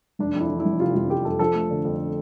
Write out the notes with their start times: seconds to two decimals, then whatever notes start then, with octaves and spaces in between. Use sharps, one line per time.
0.19 F1 D4
0.35 F2
0.40 E4
0.49 E3
0.59 E4
0.65 F1
0.80 C3 F4
0.95 F1 F4
1.10 F2 G4
1.25 F2 A4
1.39 F3 A4
1.55 A3
1.71 D3
1.85 F2